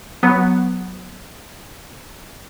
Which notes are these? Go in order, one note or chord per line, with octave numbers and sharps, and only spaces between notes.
F#3 B3